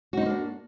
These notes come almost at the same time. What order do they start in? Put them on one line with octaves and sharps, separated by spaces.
F#4 D#4 C4 A#3 D4